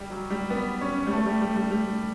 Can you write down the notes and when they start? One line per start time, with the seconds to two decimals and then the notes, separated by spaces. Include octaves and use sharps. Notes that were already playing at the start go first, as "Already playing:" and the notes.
Already playing: G3
0.10 F#3
0.30 G3
0.50 B3
0.81 C#4
1.06 G3
1.11 A3
1.26 G3
1.41 G3
1.56 G3
1.71 G3